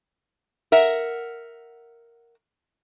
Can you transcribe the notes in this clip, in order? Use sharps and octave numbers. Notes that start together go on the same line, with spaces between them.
A#4 E5 F#5